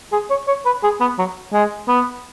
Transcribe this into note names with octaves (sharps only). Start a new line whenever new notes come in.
G#4
C#5
C#5
B4
G#4
B3
F#3
G#3
B3